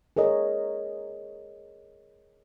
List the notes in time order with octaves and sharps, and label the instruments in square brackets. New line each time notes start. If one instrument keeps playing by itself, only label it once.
[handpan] G#4 A#4 C#5 D#5